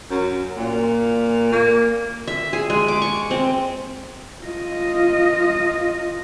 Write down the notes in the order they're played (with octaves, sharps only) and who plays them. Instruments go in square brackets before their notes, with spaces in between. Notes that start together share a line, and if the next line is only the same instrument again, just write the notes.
[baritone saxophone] F#2
A#2
A#3
[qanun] E5
G#4
G#3
D6
C#6
C4
[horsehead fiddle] F4 D#5